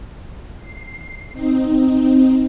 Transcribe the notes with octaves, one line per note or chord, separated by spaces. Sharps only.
C7
C4 D#4